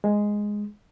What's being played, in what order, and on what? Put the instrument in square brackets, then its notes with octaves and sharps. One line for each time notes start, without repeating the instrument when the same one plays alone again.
[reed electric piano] G#3